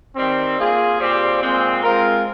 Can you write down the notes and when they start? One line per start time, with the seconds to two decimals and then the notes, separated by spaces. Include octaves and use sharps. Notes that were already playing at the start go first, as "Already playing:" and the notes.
0.16 D#3 G3 C4
0.58 A#3 F4 G#4
1.00 A#2 G3 C4 G4 C5
1.41 A#2 G#3 C4
1.83 G#3 C4 F4 A#4